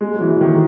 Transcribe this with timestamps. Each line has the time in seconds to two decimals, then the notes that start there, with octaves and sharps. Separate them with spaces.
0.01 G#3
0.15 F#3
0.21 E3
0.41 D#3